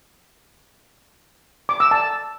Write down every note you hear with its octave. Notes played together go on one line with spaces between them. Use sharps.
D6
E6
A5